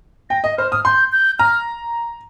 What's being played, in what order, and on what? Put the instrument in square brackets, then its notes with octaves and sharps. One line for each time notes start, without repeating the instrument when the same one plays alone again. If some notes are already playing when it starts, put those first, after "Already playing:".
[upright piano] G5 [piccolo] A#6
[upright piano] D#5
[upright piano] C5 [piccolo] F6
[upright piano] D#6 [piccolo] F6
[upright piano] C6 [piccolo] G6
[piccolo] G6
[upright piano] A#5 [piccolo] F6